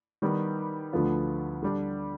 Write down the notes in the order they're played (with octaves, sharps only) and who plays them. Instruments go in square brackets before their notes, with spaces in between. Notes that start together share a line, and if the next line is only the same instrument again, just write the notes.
[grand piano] D#3 G3 B3
D2 D3 F3 B3 F4
D3 G3 D4